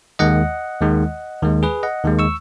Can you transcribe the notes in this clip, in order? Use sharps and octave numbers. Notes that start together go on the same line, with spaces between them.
D#2 D#3 G#3 D#5 F#5
D#2 D#3 G#3
D#2 D#3 G#3
G#4 B4
D#5 F#5
D#2 D#3 G#3
C#6 E6